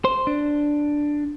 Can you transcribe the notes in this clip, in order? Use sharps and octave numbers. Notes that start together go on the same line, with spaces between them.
C5
D4